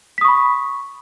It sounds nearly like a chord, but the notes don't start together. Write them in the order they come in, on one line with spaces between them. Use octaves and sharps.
B6 D#6 C#6 B5